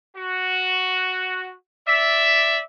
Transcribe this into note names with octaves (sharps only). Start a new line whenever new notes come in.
F#4
D5 E5